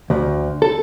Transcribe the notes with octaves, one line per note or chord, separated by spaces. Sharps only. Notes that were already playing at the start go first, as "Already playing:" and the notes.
D2
A4